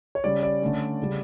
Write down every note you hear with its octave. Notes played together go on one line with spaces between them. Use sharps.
C#5
C#3 G3 C#4 D5
D5
D3 A3 C#4
C#3 G3